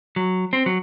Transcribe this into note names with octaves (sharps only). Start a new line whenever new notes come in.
F#3
C4
F#3